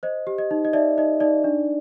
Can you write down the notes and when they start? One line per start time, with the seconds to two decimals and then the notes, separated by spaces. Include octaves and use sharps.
0.03 C5 D#5
0.27 G4
0.38 D#5
0.51 D#4
0.65 D#5
0.73 D#4 D5 E5
0.98 D#4 D#5
1.20 D#4 D5
1.44 D4